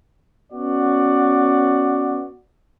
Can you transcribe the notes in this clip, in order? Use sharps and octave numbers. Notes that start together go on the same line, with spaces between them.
B3 C#4 F#4 D5